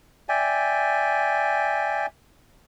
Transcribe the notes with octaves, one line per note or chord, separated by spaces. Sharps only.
D5 E5 G5 G#5